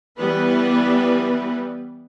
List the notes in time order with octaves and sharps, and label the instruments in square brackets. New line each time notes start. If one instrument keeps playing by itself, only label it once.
[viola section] E3 G3 B3 B4